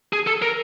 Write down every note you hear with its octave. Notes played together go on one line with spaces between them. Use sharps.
G#4
A4
A#4